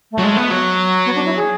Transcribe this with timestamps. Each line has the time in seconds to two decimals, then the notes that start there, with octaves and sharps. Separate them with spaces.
0.12 A3
0.18 F#3
0.22 G#3
0.36 B3
0.50 F#3
1.06 B3
1.15 D4
1.26 E4
1.36 G#4